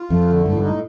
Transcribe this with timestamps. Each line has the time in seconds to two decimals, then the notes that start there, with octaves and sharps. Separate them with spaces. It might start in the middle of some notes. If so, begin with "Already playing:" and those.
Already playing: F4
0.10 F2 A3
0.28 D3
0.45 G2 A3
0.52 A2
0.57 G2
0.63 D#4
0.69 A2